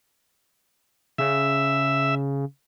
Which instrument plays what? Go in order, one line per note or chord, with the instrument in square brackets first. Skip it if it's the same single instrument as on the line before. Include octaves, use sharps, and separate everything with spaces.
[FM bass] C#3 [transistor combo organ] E5